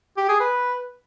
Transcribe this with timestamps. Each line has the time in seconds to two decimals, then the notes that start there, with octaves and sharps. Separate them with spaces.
0.17 G4
0.29 G#4
0.40 B4